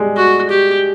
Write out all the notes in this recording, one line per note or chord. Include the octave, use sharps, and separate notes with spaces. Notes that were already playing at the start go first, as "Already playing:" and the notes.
Already playing: G3 G#3
F#4
G4